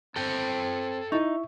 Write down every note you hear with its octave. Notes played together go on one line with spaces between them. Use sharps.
C4 A4 G5
D#4 E4 E5 C#6